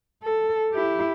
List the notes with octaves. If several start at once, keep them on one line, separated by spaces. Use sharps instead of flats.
A4
E4 G4